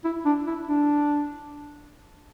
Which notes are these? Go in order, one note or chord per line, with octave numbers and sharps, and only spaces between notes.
E4
D4
E4
D4